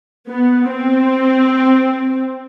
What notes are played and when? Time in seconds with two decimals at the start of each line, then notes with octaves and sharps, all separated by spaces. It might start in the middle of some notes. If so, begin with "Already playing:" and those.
0.29 B3
0.70 C4